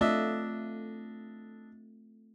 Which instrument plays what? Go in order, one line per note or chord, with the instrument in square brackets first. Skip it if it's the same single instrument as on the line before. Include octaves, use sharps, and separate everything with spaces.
[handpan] A3 C4 F4 [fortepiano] D4 D#5 E5